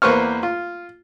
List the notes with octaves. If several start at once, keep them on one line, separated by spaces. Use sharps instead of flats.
E2 A#3 B4 C5 C#6 F6
F4